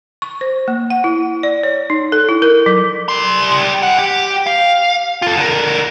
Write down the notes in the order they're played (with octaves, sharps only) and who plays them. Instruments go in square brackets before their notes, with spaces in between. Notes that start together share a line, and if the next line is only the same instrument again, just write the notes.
[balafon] C#6
C5
A#3
F#5
E4
D5
C#5
D#4
A4
E4
A#4
F#3
[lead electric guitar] G3 C6
E3 F#5
G4
F5
F4 A4
D3 A#4